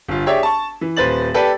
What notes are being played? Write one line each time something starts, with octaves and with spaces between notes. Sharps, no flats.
G1 F4
G4 G#4 C#5 D5 E5
A5 C#6
E3
D#1 B4 C5 A6 F#7
G4 A4 B4 D5 G5